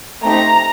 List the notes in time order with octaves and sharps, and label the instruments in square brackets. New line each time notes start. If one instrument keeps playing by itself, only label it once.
[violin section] A3 C4 D#4 G4 A#5